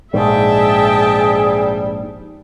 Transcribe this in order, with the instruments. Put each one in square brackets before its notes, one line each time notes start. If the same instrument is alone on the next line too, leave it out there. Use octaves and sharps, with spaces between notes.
[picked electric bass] A#1 G#2 [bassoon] G3 [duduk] G#4 [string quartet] E5 G5 A5